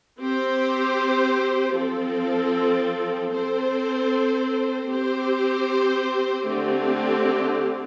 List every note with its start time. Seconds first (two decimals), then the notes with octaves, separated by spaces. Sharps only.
0.19 C4 G4 C5
1.75 F3 C4 A4
3.31 C4 A4 C5
4.88 C4 G4 C5
6.44 D3 A3 C4 G4